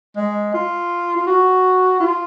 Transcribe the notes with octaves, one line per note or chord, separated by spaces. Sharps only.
G#3
F4
F4
F#4
F4